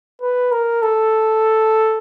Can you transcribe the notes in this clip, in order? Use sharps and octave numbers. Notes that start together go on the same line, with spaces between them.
B4
A#4
A4